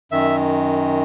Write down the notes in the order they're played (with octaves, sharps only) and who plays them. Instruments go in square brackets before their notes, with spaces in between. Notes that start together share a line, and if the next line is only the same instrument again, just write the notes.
[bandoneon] F#2 D#3 E5